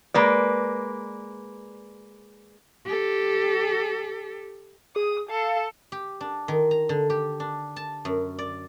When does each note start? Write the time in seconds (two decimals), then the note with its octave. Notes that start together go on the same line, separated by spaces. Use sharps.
0.14 G#3 A#3 B4 D5
2.85 G4 A4
4.96 G#4 D#6
5.29 A4 F5
5.92 G4
6.21 D4
6.48 D#3
6.71 A#5
6.89 D3
7.10 G4
7.40 D4
7.76 A5
8.05 F#2
8.39 D5